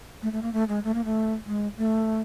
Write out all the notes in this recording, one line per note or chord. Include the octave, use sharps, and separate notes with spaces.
A3
A3
A#3
A3
G#3
A3
A#3
A3
G#3
A3